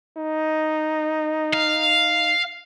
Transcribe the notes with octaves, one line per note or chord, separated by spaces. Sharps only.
D#4
F5